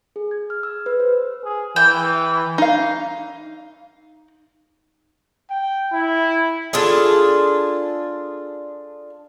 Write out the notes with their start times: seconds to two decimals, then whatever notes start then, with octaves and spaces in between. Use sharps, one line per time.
0.16 G#4
0.31 G#6
0.50 F6
0.63 E6
0.86 B4
1.00 C5
1.44 G#4
1.76 E3 G5
2.58 D#4 F5
5.50 G5
5.93 E4
6.73 D4 F4 G#4 A4